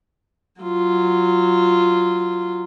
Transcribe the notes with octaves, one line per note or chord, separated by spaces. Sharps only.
F#3 F4